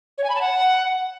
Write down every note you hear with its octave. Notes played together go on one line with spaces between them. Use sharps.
C#5
G#5
B5
A5
F#5